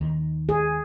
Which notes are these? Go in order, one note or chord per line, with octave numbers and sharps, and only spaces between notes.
D#2 D#3
G#4